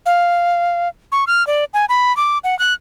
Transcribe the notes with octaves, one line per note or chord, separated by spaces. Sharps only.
F5
C#6
F6
D5
G#5
B5
D6
F#5
F#6